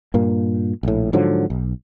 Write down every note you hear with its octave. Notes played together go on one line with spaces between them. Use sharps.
G2 A#2 A#3
A#1 A2
G#2 D3 F3 F#3
B1